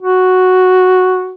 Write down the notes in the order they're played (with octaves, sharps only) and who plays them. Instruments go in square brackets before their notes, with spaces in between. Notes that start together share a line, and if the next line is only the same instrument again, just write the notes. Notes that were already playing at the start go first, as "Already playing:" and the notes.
[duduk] F#4